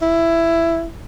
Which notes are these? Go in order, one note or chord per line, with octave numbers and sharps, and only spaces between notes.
E4